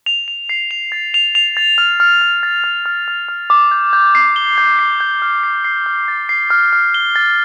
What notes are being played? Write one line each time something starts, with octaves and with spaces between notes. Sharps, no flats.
F7
F7
C7
F7
A6
F7
F7
A6
F6
F6
F6
A6
F6
F6
F6
F6
D6
G6
G6
C7
G7
G6
C7
G6
F6
C7
C7
F6
A6
C7
F6
F6
G7
A6